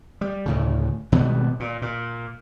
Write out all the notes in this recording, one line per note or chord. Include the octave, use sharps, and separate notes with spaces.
G3
D2 A2 C#3
G#1 B2 G3 B3
A#2
A#2